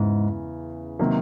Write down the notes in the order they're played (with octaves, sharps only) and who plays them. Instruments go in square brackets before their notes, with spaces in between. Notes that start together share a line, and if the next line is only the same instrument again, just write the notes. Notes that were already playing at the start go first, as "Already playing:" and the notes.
Already playing: [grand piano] E2 C#3 E3 [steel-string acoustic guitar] G#2
[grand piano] C3 D#3 F#3 A#3